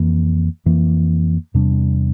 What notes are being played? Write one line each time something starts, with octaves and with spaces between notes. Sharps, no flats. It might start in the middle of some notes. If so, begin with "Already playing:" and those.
Already playing: F2 E3 A#3
F2 E3 A#3
E2 C3 G3 D4